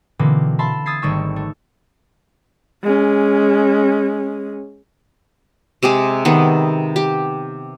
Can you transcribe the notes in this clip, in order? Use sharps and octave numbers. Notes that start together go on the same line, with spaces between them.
B2 D3 E3 A#3 C4
E5 F5 A5 B5 C6
D#6 E6 G#6 A6 B6 C7
G#1 G3 A3 D#4 C#6 E6
A3
G#3 C#4
C3 G#3 G4 G#4
C3 D#3 B3
G4